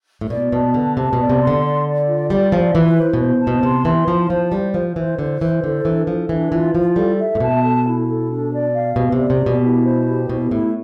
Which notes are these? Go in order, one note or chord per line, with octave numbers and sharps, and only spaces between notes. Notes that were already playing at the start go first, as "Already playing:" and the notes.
A2
B2 D5
B2 A5
D3 B4
C3 A5
B2
D5
C3
C6
D3
D5
D5
F4
G3 D5
F3 F4
E3 B4
C5
B2
C5
A5
B2
C3 C6
E3 C6
F3 A5
F3 C5
G3 C5
F3 C5
E3 C5
D3 C5
E3 C5
D3 A4
E3 D4
F3 A4
E3 D4
E3 F4
F3 F4
G3 A4
E5
A2
B2 A5
A4
E4
A4
D4
D5
F5
B2 G4
C3
D5
C3
G4
B2
E4
C5
G4
B2 E4
A2 E4